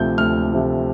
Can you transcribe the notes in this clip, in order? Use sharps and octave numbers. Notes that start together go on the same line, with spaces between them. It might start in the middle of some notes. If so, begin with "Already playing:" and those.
Already playing: D2 C3 F3 A3 G6
D2 F6
C3 F3 A3